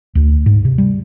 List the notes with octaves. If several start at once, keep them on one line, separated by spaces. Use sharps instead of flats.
D2
G#2
C3
G3